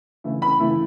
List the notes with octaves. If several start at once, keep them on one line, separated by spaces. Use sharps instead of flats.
C#3 E3 A3 E4
B5
C#3 E3 A3 E4